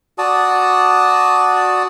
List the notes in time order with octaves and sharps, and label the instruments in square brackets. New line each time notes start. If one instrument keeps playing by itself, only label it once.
[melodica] F#4 D5 A5 D#6